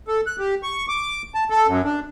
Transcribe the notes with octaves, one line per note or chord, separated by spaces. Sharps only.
A4
F#6
G4
C#6
D6
A5
A4
F#2
D4